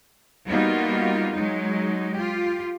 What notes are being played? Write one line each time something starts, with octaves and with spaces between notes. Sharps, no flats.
G3 A#3 B3 D#4 F4 F#4
F#3 G#3 D#4
F4 G4